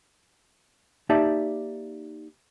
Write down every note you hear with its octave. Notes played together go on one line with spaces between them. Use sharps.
A#3 D#4 G4 D5 E5 A5